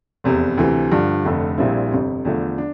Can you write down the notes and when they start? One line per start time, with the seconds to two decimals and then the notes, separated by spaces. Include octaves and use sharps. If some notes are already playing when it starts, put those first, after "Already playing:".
0.24 F1 E2 C3
0.58 D2 C3 E3
0.92 G2 D3 F3
1.25 F1 F2 D3 A3
1.58 A#1 A#2 G3 C4 E4
1.92 G1 F2 C3
2.25 E2 D3 F3 A3
2.58 D4